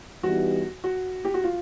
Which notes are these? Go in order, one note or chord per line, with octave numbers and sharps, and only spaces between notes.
E3 G3 B3 D#4 F#4 G4
F#4
G4
F#4
F4